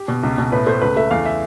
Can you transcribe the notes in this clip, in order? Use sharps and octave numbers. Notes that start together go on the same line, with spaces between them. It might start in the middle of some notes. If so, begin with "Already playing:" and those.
Already playing: G4
B2
C#2
B2
A2 B4
A3 C5
C#2 B4
A3 E5
E2 F5
E5